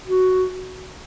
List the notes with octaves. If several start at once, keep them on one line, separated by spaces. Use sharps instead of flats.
F#4